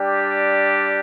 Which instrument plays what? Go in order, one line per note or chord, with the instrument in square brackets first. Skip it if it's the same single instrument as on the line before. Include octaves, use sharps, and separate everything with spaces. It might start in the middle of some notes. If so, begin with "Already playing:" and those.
Already playing: [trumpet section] G3 D4 G4